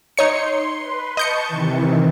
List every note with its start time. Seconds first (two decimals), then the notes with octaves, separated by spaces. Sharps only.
0.17 D#4 C#5 C6 C#7
0.79 B4
1.17 D#5 A5 C#6 G6 C#7
1.48 C3 D#3 E3